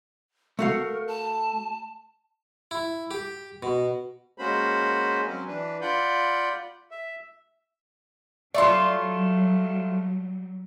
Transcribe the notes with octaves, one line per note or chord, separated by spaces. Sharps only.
A3 F#4 A#4 F5
A5
E4
G4
B2
G#3 A#3 C#4 F#4 C5 B5
F#3 C4 C#4
E3 D4 B4
F4 D5 F#5 B5 G6
E5
F#3 G3 A3 F4 D5 E5 C6